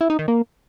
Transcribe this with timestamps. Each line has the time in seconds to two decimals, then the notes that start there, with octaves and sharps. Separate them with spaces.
0.01 E4
0.10 D#4
0.19 D#3
0.28 A#3